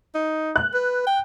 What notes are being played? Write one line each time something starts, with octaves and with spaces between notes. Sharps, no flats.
D#4
F#6
B4
G5